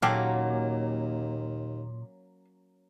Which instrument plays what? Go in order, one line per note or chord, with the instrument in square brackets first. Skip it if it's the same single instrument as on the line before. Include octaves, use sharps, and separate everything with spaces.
[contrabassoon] D#2 [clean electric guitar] A#2 [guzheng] F#3 A#3 C#4 [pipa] G4 A4 F5